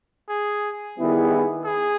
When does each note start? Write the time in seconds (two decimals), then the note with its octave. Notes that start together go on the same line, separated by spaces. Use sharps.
0.29 G#4
0.97 D#3 G3 B3 E4 G#4
1.64 G#4